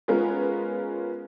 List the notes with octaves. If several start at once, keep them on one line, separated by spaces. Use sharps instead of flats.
G#3 B3 C#4 F4 A#4